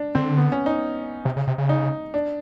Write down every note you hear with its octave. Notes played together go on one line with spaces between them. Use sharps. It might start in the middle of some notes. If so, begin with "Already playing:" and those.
Already playing: D4
D3 C4
B3
C#4
D#4
C3
C#3
C3
C#3
D#4
D4